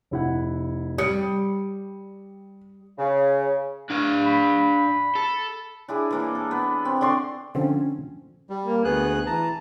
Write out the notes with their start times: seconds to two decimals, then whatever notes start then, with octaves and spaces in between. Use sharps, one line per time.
0.11 F1 E4 F#5
0.98 G3 D#6 C#7
2.98 C#3
3.90 D4 F5
4.26 B5
5.16 A4
5.88 D4 E4 G#4
6.11 E3 A#3 D4
6.35 A4
6.51 B3
6.85 C4
7.01 D3 D5 C6 C#6
7.55 D3 F3 C4 C#4
8.50 G3
8.66 A#3
8.84 D2 B3 G#4 F#6
9.26 E3 A5 A#5